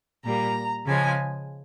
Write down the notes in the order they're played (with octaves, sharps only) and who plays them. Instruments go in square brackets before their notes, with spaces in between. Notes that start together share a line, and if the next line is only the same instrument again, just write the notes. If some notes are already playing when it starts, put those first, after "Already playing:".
[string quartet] A#2 G3 A#3 A#5
C#3 F3 G#3 G#5